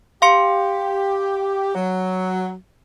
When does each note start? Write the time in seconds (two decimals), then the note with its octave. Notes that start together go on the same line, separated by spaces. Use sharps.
0.22 G4 F5 C6 C#7
1.75 F#3